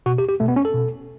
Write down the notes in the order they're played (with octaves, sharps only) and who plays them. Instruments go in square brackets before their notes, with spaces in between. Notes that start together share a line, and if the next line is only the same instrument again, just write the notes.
[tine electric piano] B2 F#4
G4
G4
B2 A3
B3
C#4
A4
B2